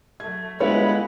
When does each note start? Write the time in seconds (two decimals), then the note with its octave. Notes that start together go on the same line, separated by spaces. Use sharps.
0.20 F#3 A3 G#6
0.60 G1 G#3 E4 B4 C#5 F5 F#5